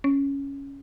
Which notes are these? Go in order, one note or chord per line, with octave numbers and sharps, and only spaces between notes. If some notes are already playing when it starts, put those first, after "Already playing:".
C#4